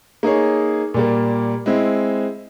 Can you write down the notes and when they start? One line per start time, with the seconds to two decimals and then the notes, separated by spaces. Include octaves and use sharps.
0.23 A#3 D#4 G#4 C#5
0.94 A#2 G3 A#3
1.66 G#3 C4 E4